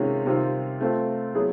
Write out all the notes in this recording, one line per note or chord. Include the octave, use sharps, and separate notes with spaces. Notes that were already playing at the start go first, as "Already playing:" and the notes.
Already playing: C3 D#3 G#3 C#4 F4
C3 D#3 G3 C4 F4
A3 C4 F4
F#3 B3 E4 G#4